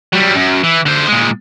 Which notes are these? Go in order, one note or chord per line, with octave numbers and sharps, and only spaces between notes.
F#3 G3
F#2
E3
D3 C5
A#2 G#3